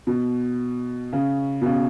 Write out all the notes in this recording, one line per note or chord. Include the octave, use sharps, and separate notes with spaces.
B2
C#3
B2
C#3